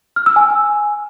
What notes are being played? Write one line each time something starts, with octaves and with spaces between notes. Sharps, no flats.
F6
E6
G#5